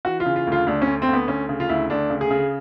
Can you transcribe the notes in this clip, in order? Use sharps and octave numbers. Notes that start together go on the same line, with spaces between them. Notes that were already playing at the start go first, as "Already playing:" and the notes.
E3 F#4
F4
C#3
F4
D2 F4
D2 D4
C#4
D2
C4
D2 B3
D2 C#4
C#3
F4
D2 E4
D2 D4
C#3
G#4
C#3